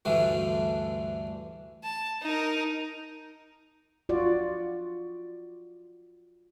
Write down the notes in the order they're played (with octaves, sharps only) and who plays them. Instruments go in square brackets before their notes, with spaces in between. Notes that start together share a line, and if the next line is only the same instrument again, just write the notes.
[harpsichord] D2 G2 D3 E3 A3
[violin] A5
D#4 A#4
[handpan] F4 F#4 D5